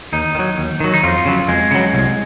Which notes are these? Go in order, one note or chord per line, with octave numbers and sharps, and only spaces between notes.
D#2 D#4
D#3
F#3
D#2
D#3 F#3
D#4
F2 F4
C#3 F#3
F2 G#3
C#3 F#3
C2